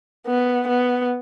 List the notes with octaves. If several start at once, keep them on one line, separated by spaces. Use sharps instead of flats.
B3
B3